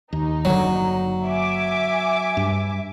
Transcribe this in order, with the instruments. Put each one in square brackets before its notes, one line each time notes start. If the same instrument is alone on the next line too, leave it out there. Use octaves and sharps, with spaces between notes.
[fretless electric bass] D#2 [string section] D#4
[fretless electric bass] F#1 D3 [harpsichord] F#3
[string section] E5 G#5 D6
[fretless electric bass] G2